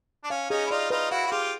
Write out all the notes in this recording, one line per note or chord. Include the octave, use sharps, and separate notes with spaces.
D4
C#4 F5
C#4 D#4 G#4
E4
D#4 F4 D5
D#4 F4 B4
E4 F#4 F5
F#4
F4 G4 G#4